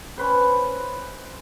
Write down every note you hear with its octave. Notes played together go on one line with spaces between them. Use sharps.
C#4 B4 C5